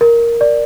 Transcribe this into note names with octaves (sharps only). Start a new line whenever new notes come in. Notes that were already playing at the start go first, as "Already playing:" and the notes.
A#4
D5